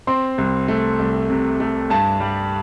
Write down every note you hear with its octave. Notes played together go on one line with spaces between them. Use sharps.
C4 C6
C2
A3
C2
C3
A3
G2 A5
G3